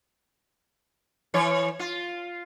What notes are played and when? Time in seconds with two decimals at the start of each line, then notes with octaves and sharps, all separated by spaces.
1.34 E3 C#5
1.79 F4